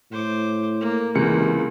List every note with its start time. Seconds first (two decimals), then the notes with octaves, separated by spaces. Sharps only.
0.12 A2 C5 D6
0.80 A#3
1.15 C#2 C3 E3 A#3 C#7